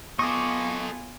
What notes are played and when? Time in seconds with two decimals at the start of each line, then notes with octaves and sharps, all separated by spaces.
0.19 B3 F4 A4 D#5 G#5 C#6 D6